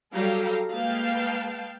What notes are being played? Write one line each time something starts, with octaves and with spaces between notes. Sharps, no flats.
F#3 G3 G4 A4 F5 A#5
G#3 A#3 B4 F5 G5 A5